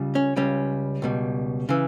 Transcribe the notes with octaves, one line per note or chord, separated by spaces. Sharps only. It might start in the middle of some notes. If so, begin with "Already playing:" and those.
Already playing: C#2 C#3 G3
C#4
C#2 C#3 G3 C#4
C#2 B2 G3
C#3 E3